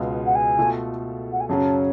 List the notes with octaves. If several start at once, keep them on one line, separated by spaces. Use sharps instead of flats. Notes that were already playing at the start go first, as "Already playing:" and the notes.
Already playing: C#2 B2 G#3 B3 F4
F#5
G#5
B2 A3 F4 A4
F#5
G#5
F#2 C#3 F#3 C#4 A5